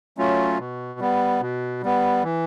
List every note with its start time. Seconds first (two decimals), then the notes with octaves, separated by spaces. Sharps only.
0.18 F#3 A3 C#4 F4
0.59 B2
1.00 G3 B3
1.41 B2
1.83 G3 B3
2.23 E3